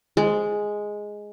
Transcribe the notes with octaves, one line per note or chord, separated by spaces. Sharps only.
G#3